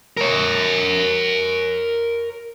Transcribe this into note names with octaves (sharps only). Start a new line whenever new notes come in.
A#4 C#5